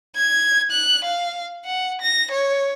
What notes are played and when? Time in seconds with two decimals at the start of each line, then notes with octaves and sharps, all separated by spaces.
0.16 G#6
0.71 F#6
1.04 F5
1.65 F#5
2.01 A#6
2.31 C#5